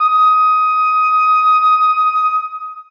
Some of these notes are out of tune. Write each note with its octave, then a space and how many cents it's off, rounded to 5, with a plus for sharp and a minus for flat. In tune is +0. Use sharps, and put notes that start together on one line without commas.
D#6 +15